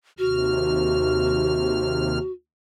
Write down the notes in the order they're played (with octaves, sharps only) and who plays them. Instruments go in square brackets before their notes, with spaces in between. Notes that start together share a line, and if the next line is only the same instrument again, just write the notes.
[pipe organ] D#2 C3 F6 [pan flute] F#4